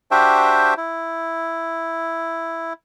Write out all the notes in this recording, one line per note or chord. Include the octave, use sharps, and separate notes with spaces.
D4 F#4 G4 C5 E5 G5
E4